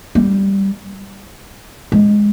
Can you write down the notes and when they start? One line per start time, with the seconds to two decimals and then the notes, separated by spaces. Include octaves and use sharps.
0.15 G3
1.92 G#3